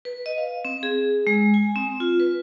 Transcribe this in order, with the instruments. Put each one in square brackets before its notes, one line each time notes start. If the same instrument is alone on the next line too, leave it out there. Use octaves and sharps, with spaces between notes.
[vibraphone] B4
D#5
F5
C4
G#4
G#3
G#5
C4
F4
B4